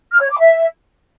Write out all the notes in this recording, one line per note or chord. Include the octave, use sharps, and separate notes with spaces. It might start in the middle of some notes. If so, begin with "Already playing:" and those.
F6
C#5
D6
E5